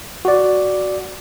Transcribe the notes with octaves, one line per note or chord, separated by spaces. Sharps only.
F#4 D5